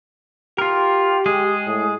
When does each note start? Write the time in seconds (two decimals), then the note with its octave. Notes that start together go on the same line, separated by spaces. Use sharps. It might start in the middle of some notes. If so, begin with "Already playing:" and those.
0.58 F4 G4 A#4
1.26 G#3 G#4
1.67 A2